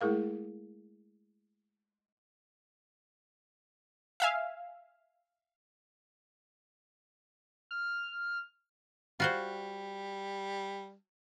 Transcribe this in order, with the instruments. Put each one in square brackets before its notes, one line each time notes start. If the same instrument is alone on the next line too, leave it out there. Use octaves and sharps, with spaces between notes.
[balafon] G#3 A3 E4 G#4 A#4 F5
[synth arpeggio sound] E5 F5 G#5
[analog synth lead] F6
[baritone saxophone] G3 [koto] F4 F#4 C5